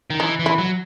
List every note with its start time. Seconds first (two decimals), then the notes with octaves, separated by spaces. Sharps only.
0.10 D#3
0.20 E3 D#4
0.39 E3
0.46 E4
0.58 F#3